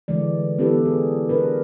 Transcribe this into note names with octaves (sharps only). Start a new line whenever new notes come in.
D3 E3 G#3 D5
B3 D4 E4 G4 A4 B4
G#4
D4 A#4 B4